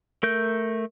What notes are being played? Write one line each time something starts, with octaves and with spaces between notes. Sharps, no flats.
A3 A#4 G6